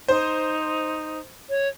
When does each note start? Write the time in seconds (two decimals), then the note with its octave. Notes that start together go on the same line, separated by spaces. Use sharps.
0.08 D#4 C5
1.50 C#5